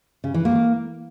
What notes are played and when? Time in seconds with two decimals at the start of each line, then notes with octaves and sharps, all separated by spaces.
0.24 C#3
0.34 E3
0.45 A#3